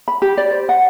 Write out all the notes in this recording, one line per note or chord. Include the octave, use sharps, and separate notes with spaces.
B5
G4
D5
C5
F#5